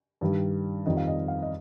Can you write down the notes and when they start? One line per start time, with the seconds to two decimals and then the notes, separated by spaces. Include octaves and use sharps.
0.21 G2 D#3 G3
0.86 F2 D#3 G3 D#5
0.97 F5
1.08 D#5
1.28 F5
1.43 D#5